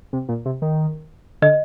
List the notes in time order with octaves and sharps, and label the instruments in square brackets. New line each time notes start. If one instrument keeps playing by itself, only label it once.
[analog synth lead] C3
A#2
C3
D#3
[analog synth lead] D3 [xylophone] D#5